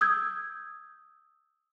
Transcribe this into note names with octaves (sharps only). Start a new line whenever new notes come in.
D#6 E6 G6 G#6